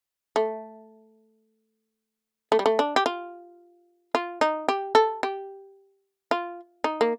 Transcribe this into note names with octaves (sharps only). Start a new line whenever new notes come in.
A3
A3
G3
A3
D4
G4
F4
F4
D#4
G4
A4
G4
F4
D#4
A#3